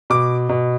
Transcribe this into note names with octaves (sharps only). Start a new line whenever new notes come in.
B2 D6
B2